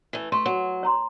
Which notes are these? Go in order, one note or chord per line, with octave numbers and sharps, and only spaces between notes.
E3 A3
A3 C6 C#6
F#3
C#5 A#5 C6